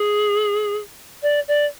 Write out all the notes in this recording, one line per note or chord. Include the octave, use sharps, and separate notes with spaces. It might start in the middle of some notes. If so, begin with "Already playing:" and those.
Already playing: G#4
D5
D5